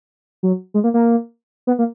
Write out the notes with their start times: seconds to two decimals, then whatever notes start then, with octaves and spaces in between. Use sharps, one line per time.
0.43 F#3
0.74 G#3
0.84 A#3
0.94 A#3
1.67 B3
1.79 A#3